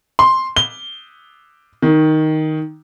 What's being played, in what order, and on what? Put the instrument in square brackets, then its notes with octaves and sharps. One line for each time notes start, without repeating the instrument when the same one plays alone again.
[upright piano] C6
G7
D#3